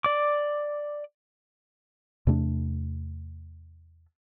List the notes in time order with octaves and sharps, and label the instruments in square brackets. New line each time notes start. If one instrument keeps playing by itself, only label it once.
[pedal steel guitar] D5 D6
[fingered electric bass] E2 C3 A3 D4